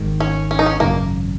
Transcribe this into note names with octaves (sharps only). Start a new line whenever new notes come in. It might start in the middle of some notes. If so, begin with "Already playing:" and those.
Already playing: G#1 G#2 D#3
C#4
C#4
D#4
C#4
G#1 F#2 C#3 F#3 A#3